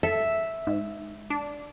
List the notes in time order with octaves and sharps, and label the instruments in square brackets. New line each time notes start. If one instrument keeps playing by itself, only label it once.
[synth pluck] A4 [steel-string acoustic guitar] E5
[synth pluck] G#2
D4